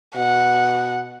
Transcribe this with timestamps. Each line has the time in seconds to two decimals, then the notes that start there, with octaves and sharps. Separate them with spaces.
0.16 B2 F#5